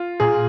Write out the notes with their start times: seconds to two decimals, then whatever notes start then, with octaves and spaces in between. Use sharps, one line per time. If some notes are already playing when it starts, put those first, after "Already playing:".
Already playing: F4
0.20 A#2 G#4